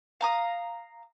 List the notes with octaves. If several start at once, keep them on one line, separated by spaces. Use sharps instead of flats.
F5 A#5 D#6